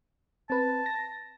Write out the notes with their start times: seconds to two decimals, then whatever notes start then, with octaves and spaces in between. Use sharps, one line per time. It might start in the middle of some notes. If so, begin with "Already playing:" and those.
0.50 C4 B4 A5
0.86 A#6